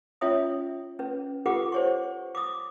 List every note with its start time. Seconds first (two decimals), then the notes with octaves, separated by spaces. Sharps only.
0.21 C#4 F4 C#5 E5 D#6
0.99 C#4 B4
1.46 F4 G4 A4 B4 F#5 D6
1.72 C5 C#5 C#6
2.35 D6 D#6